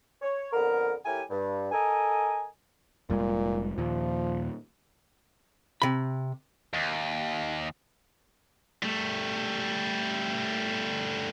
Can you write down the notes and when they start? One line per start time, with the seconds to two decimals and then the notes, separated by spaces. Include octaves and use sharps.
0.22 C#5
0.53 F2 D3 B3 A#4
1.05 A2 E4 G4 A#4 G#5
1.30 G2
1.72 A4 A#4 D#5 G#5
3.10 F1 A#2 G3 G#3
3.78 D#2 A#2 F3
5.82 C3 B5
6.74 D#2
8.83 G3 A3